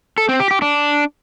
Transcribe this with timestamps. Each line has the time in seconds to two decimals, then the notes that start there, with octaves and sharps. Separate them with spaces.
0.18 A4
0.29 C4
0.40 G4
0.51 G4
0.62 D4